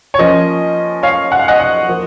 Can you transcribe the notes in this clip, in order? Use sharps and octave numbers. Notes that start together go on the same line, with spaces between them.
C#5
F3 A#3 C#4 D#5
C#5 F5
F#5
F5
D#5 F#5
D#5
F3 A#3